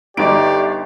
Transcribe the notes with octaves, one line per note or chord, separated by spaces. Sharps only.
G1 D#4 G4 D5 D#5 D7